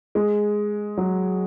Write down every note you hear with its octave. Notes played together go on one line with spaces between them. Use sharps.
G#3
F#3